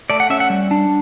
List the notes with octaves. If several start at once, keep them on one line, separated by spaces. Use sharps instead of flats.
A3 D5
F#5
C#4 E5
F#5
G3
D4